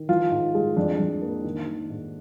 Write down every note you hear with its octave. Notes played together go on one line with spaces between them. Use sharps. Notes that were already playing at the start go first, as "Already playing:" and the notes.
Already playing: D#3
F3 F4
G#2
G#3
F2 D4
F2
A#3
D#3
D#3
G#2